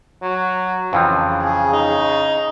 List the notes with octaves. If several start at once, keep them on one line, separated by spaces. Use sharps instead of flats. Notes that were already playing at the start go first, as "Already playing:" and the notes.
F#3
F2 C#3 E3 F3
G#4
D#4